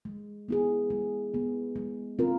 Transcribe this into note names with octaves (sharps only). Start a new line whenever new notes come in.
G#3
B3 E4 G#4
G#3
B3 E4 G#4
G#3
C4 F4 A#4